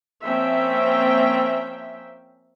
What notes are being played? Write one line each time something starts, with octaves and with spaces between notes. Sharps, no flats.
F3 A#3 C4 C#4 E5 G5